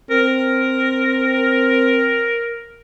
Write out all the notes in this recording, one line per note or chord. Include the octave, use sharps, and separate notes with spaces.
C4 A#4